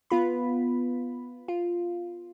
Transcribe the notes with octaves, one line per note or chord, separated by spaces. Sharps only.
B3 F4 B5
F4